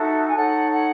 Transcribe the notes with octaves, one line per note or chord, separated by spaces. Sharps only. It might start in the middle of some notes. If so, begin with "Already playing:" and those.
Already playing: D#4 F#4 A4 E5
G#5
D#4 A4 C#5 F#5
F#5